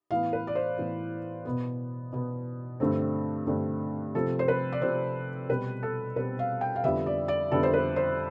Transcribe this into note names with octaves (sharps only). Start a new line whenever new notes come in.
A2 E3 B3 F5
B4
D5
C5
A2 E3 B3
B2 B3
B2 B3
G2 D3 A3 C4
G2 D3 A3 C4
C3 F3 C4 A4
C5
B4
D5
C3 F3 C4 C5
B2 G3 C4 B4
A4
B2 G3 C4 B4
F5
G5
F5
F2 D3 G3 B3 E5
D5
D5
F2 D3 G3 B3 A4
C5
B4
C5